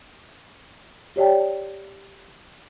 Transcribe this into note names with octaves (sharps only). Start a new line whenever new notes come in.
G4 C#5 D5 G5 A5